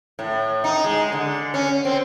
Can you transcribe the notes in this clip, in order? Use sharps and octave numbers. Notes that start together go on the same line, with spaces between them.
A2
D#4
G#3
D3
C#4
C4